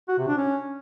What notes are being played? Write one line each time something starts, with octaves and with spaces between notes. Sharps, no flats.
F#4
C3
D4
C#4